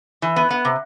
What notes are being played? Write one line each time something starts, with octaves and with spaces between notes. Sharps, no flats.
E3
B3
B3
C3